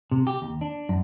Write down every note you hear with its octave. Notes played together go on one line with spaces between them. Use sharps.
C3
G4
D#2
D4
F#2